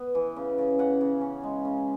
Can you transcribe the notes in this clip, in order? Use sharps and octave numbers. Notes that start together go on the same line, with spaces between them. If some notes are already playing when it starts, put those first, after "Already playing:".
Already playing: B3
E3
C#3
C#3
C#3 F#5
C#3
C#4
G#3
C#3